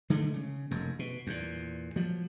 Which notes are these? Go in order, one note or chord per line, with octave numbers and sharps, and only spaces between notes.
D3 D#3 G#3 A3
C#3
F1 F#2
B2
E2 A#2
F3 F#3